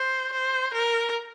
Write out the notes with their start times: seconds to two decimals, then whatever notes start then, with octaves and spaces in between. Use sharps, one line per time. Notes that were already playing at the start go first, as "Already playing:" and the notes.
Already playing: C5
0.32 C5
0.74 A#4